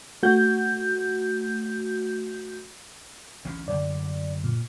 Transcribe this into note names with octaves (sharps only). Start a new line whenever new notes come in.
A3 F#4 G6
D2 E3 C#4
F#2 D3 D5
A#2